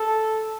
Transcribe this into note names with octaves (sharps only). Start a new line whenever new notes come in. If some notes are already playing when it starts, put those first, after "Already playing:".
Already playing: A4